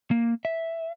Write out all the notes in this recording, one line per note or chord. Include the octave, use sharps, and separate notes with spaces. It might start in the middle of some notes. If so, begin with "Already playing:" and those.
A#3
E5